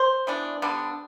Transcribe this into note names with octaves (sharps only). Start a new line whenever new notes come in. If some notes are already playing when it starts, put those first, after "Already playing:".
Already playing: C5
E3 B3 D4
D3 G3 B3 D4